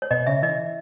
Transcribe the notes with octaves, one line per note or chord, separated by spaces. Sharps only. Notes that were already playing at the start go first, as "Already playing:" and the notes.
C#5
B2 D#5
C#3 E5
E3 D#5